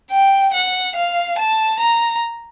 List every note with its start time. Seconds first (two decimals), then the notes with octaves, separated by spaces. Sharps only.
0.11 G5
0.53 F#5
0.96 F5
1.38 A5
1.80 A#5